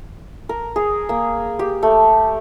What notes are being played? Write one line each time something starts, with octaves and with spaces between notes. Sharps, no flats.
A#4
G#4
A#3
G4
A3